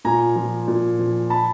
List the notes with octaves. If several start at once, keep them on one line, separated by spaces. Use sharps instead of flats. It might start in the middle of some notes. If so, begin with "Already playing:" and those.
A#2 G#5 A#5
F3
A#2
F3
A5 B5